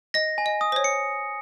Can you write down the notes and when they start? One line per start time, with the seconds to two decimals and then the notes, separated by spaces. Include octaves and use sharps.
0.14 D#5 A#6
0.38 G#5
0.46 D#5
0.61 D#6
0.72 C5
0.76 C#5
0.84 C#7